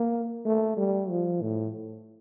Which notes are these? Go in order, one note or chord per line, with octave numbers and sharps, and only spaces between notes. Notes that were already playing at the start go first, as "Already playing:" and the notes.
Already playing: A#3
A3
G3
F3
A2